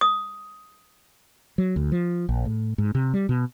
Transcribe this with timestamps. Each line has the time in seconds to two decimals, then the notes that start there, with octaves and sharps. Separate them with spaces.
0.01 D#6
1.58 F#3
1.76 D2
1.92 F3
2.29 A#1
2.45 A2
2.78 G#2
2.95 C3
3.14 G3
3.29 B2